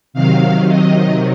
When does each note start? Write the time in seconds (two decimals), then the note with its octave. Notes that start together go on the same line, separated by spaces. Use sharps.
0.14 C3 D#3 F#3 F5
0.69 D#5